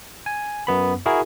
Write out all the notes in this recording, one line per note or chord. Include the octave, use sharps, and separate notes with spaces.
G#5
F#2 B3 B5
E4 F#4 G#4 A#4